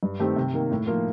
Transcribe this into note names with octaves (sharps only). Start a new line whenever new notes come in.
G2
D#3 A3 C4 G4
C3
D#3 A#3
A2
F3 A#3 F4